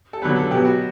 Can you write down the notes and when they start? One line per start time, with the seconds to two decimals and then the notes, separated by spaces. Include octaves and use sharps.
0.13 A4
0.22 D3 F#3 B3 B4
0.36 A4
0.51 B2 F#3 B3 G4
0.65 F#4